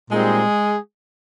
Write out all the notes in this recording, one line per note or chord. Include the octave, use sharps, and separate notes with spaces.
A#2 G3 G#3 C4 D#4 G#4